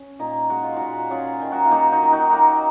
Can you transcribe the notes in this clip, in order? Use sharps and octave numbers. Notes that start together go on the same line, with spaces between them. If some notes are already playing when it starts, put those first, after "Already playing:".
Already playing: C#4
A#2 D#4
G#3 F#4
F4
A#2 D#4 F#4
C#4 F4 G#4
D#3
D#4 F#4
F4
A#3 D#4 F#4
D#4 F#4
D#3
D#4 F#4
A#3